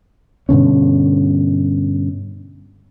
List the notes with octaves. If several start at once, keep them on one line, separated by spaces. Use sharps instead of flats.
G2 B2 D3 C#4